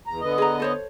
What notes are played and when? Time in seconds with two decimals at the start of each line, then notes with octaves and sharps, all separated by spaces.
0.07 E2 A#5
0.21 D3 B3 D#5
0.38 G#4 B4 A#5
0.60 A4 C5 C#5